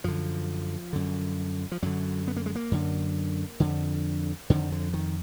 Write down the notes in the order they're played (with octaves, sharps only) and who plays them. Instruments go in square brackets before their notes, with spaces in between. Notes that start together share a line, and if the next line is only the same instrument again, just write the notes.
[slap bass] F#2 D3 F3
F#2 D3
F3
F#2 D3 F#3
B3
A#3
G#3
A#3
F#2 D3
F2 D3
F2 D3 D#3
D3
D#3